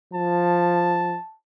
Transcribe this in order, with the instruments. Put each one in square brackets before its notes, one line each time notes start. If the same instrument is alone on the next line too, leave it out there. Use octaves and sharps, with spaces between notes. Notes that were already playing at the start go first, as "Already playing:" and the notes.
[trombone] F3 [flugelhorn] A5